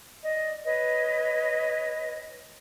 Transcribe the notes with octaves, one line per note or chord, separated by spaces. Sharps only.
D5 D#5
B4 C#5 D#5